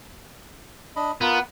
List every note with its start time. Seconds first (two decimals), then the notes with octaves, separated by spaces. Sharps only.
0.96 D4 D#5 B5
1.21 B3 F4 A#4